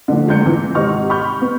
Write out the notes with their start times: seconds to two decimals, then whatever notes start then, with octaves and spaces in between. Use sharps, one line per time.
0.08 A#1 D3
0.28 C#2 D3 G6 C#7
0.46 E3
0.75 G#1 C3 D#4 C#6 F6
1.10 B5 C#6 F6 G6
1.42 B3